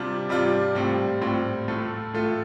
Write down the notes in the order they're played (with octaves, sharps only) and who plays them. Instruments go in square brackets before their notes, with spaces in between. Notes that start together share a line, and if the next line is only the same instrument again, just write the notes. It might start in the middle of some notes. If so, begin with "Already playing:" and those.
Already playing: [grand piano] C3 G3 D4 F4
C3 G3 D4 F4
A2 G3 C4 F4
A2 G3 C4 F4
A2 A3 F4 A4
A2 A3 F4 A4